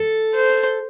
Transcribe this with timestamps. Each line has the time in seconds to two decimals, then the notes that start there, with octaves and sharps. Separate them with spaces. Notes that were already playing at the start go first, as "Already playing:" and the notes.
Already playing: A4
0.35 C5